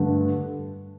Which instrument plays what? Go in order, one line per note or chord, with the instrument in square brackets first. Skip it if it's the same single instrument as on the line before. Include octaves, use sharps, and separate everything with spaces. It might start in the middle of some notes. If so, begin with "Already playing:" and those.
Already playing: [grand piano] G2 D3 A3 D4